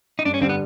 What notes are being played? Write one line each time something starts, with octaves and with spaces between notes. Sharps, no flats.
D#4
G2 D4
C#4
D3 G3 C4
B3